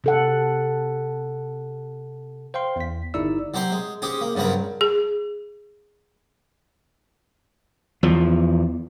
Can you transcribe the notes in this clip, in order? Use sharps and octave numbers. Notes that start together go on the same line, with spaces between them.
C3 A4 F#5
C5 F5 G5 C6
E2 B6
G1 D#4 E4 D5 E6
F#3 C4 G4 C5 C6
G#3
C4 C#4 G4 G#4
A#3
G2 C#3 F#3 C4 A#4
G#4
E2 F3